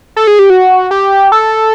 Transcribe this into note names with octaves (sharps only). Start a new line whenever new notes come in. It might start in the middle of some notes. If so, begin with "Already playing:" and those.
A4
G#4
G4
F#4
G4
A4